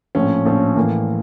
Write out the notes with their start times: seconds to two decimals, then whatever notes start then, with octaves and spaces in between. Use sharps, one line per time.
0.15 A#1 A2 F3 C#4
0.45 A#1 A2 F3 C#4
0.76 A2 E3 A#3